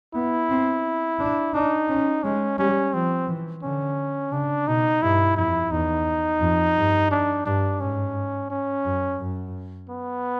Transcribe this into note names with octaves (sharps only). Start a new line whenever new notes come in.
B3 E4
C4
D4
D4 D#4
C#4
G#3 C#4
G3 C#4
F3 C4
E3
D3 C#4
C#3 D4
B2 D#4
G2 E4
F2 E4
E2 D#4
F2
G2
D4
G2 D4
G#2 C#4
C#4
F#2
F#2
B3